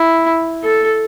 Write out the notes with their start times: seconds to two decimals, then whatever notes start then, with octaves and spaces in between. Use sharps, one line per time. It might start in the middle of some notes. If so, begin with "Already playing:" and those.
Already playing: E4
0.63 A4